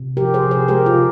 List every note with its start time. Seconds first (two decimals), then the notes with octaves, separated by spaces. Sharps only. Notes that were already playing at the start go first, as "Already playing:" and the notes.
Already playing: C3
0.17 F3 G4 A#4
0.34 G#4 C5
0.43 C3
0.51 G#4 C5
0.68 G#3 G4 A#4
0.86 F4 G#4
0.95 C#3